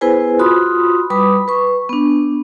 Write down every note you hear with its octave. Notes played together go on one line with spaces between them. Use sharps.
B3 E4 G#4 B4 C5 G#5
F4 F#4 B5 C6 D#6
G3 B4 B5 D6 D#6
B4 C#6
B3 D4